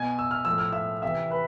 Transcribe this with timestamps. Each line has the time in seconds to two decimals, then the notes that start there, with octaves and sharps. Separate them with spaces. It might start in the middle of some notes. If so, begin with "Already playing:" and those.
Already playing: B2 G#5 G#6
0.19 E6
0.31 F6
0.45 A2 F3 E6
0.58 F6
0.73 E5 E6
1.02 C3 E3 E5 E6
1.30 B4 B5